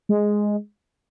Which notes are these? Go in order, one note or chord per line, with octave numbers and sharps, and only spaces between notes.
G#3